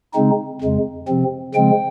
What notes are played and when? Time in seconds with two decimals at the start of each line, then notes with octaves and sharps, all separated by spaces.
0.14 C#3 G#3 C4 D#4
0.61 F2 C#3 G#3
1.08 C3 F3 C4
1.54 C#3 F3 G#3 C4 G5